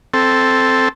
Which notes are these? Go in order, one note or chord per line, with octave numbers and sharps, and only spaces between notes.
C4 A4